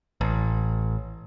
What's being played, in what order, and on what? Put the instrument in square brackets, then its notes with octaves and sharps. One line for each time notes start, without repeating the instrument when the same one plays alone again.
[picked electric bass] A1